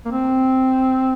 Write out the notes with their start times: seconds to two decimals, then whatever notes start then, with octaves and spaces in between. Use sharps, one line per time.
0.05 A#3
0.11 C4